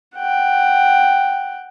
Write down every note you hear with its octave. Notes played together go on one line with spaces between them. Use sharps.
F#5 G5